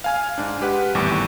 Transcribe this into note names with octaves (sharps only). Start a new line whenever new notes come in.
F5 G#5 F6
G#2 D4
G#3 G4 B4 F#5
G#1 E2 A2 G3 C#6 D6